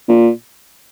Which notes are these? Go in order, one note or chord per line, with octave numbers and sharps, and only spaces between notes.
A#2